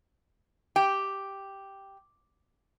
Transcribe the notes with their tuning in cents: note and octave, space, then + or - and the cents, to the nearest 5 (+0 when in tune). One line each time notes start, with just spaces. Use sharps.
G4 +0 G5 +0